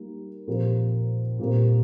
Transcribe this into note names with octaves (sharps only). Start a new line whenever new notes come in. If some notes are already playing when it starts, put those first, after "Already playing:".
Already playing: G3 A#3 D#4 A#4
A#2 F3 C4 G4 A#4
A#2 G3 C4 G4 A#4